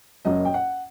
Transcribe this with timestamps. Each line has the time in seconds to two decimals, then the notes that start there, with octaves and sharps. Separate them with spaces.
0.25 F#1 F#2 F#3 D#5
0.45 G5
0.54 F#5